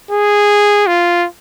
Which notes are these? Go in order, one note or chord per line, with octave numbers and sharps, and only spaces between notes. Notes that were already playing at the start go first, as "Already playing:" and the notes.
G#4
F4